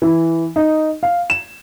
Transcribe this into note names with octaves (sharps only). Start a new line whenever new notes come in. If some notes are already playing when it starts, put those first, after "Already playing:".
E3
D#4
F5
E7